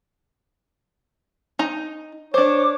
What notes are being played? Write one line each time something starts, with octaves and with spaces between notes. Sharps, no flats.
D#4 A#5
D4 C5 C#5 D6